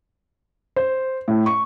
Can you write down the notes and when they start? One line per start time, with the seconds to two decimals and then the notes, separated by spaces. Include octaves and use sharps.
0.76 C5
1.28 A2
1.46 C#6